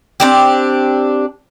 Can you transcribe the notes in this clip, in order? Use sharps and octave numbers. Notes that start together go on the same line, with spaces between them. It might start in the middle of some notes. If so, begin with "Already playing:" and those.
C4 D4 G4